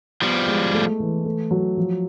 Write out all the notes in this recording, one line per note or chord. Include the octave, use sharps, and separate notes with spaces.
F3 G3 B3
G#3
A3
E3
A3
F#3
F3